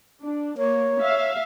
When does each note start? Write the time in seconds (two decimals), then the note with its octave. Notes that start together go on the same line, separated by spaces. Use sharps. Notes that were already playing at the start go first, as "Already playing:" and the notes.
0.22 D4
0.58 A#3 C#5
1.01 E5 F5